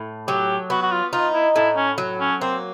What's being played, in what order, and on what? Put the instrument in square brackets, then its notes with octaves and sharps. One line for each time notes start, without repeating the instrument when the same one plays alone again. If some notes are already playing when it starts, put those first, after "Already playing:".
Already playing: [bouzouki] A2
[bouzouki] F#3 [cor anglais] G4
[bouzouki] B3 [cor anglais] F#4
[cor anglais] F#4
F4
[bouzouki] D#4 [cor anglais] F4
[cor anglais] E4
[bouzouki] A2 [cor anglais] E4
[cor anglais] C#4
[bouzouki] F#3
[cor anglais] C#4
[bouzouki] A#3 [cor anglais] C4